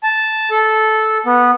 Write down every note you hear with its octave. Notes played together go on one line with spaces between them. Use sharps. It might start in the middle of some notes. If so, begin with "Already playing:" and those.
A5
A4
B3